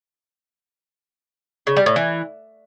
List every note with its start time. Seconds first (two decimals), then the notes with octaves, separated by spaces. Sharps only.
1.67 C#3
1.77 G3
1.86 A2
1.96 E3